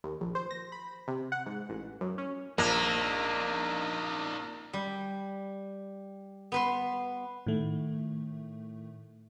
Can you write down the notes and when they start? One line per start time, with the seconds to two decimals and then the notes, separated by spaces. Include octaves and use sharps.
0.04 D#2
0.21 A#1
0.35 C5
0.51 A#6
0.72 B5
1.08 C3
1.32 F#5
1.46 G#2
1.69 A1
2.01 F#2
2.18 C#4
2.58 A#1 A#3 D4 D#4
4.73 G3
6.52 B3 B4 C6
7.47 A2 D#3 A3